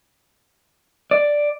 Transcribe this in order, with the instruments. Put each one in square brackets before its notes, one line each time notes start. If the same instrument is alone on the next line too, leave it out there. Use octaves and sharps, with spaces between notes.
[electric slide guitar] D5